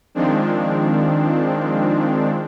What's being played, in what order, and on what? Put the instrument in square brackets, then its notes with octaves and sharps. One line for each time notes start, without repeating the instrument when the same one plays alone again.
[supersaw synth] D#3 F3 G#3 C4 D4